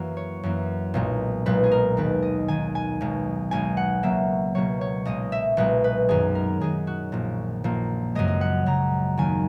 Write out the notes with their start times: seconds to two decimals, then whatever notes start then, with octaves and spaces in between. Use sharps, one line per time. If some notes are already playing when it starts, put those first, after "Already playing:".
Already playing: F#2 E3 A#3 F#4
0.17 C#5
0.43 F#2 E3 A#3
0.94 B1 A#2 G#3
1.46 B1 A#2 G#3 B4
1.64 G#4
1.71 A#4
1.97 D#2 D#3 G#3 B4
2.22 D#5
2.48 D#2 D#3 G#3 G#5
2.75 G#5
3.01 B1 B2 G#3
3.51 B1 B2 G#3 G#5
3.77 F#5
4.03 C#2 B2 F#3 A#3 E5
4.55 C#2 B2 F#3 A#3 C#5
4.81 C#5
5.05 B1 A#2 G#3 D#5
5.32 E5
5.57 B1 A#2 G#3 B4
5.84 B4
6.09 F#2 D#3 G#3 G#4
6.35 A#4
6.60 F#2 D#3 G#3 G#4
6.87 F#4
7.12 A#1 A#2 A#3
7.64 A#1 A#2 A#3
8.15 F#2 C#3 G#3 D#5
8.28 D#5
8.41 F#5
8.66 F#2 C#3 G#3 A#5
9.17 D#2 D#3 F#3 A#3 G#5